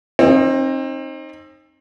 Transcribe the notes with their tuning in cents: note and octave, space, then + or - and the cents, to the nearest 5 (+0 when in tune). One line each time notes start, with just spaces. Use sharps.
C4 +35 D#4 -5